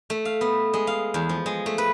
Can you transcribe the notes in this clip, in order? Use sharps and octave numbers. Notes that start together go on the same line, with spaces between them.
A3
F5
B3
G#3
F5
E2
F3
G#3
A3
B4